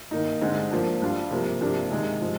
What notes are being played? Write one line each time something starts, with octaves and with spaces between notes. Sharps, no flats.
D#3 A#3 D#4
D3 G#3 C4 D#4
F3 A#3 D4
G3 D4 F4
C3 F3 A#3
C3 F3 A#3 D4
C3 D#3 G#3
F3 G#3